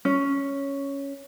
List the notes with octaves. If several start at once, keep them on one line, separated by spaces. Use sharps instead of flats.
C#4